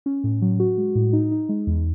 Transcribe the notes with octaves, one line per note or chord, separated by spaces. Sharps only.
C#4
A2
F#3
F#4
G#3
A2
D#4
D#4
G#3
E2